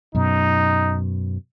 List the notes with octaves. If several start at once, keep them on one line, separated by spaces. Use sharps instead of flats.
F#2 B2 D#4